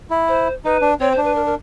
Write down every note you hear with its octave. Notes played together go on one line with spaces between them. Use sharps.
E4
C5
D#4 B4
D4
C4 C#5
C5
D4
B4
A#4
A#4